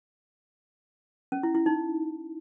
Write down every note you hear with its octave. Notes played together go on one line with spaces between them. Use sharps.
C#4
E4
E4
D#4